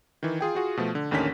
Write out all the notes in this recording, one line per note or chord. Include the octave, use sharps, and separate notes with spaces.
D#3 E3
F4 G#4 G5
F4 F#4 G#4
B2 F3 A3
D3
A1 D#2 D3 D#3 C#4 B6